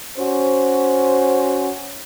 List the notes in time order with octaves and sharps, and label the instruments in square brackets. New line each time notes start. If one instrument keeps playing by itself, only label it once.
[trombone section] C#4 F#4 C5